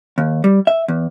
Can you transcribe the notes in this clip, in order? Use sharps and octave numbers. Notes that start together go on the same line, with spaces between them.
D#2
G3
E5
E2